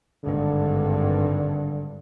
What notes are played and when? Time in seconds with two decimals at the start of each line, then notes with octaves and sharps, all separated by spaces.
0.24 G#1 G2 D3